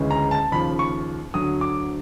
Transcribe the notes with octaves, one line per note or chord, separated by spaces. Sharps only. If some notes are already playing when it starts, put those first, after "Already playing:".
Already playing: D2 C#3 E3 G#3 C#4
A#5
A5
D#2 C#3 F3 B5
C#6
D2 D3 F#3 D#6
D6